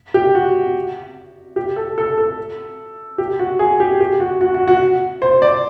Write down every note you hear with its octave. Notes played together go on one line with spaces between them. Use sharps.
G4
F#4
G4
A4
A4
A4
G4
F#4
G#4
G4
G4
F#4
F#4
F#4
F#4
C5
D5